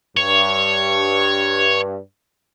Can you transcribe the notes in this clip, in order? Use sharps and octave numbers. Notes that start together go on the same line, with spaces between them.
G2 C#5